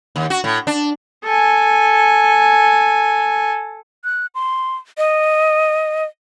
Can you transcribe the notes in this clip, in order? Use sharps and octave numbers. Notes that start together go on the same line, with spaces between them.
D#2
F#4
A2
D4
A4 G#5
F#6
C6
D#5